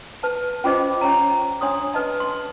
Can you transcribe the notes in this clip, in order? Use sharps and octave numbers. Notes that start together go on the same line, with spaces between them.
B4 A5
C#4 F4 G4 G#4 C5 D#5
C#4 G4 C#5 A#5
D4 C#5 C6 D#6
B4 D#5 A5
C6